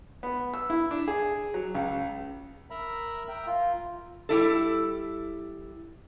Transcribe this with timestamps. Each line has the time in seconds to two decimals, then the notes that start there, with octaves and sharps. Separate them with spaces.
0.23 B3
0.54 E6
0.70 E4
0.91 D4
1.08 G#4
1.54 F#3
1.75 C#2
2.70 A#4 E5 A#5 B5
3.28 A#4 E5 G5 A#5
3.46 F4
4.29 G3 E4 A4